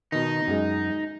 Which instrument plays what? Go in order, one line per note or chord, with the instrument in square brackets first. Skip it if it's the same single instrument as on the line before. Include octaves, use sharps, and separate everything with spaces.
[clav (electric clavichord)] B2 D#3 [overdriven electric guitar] D#4
[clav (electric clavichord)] F#2 G#3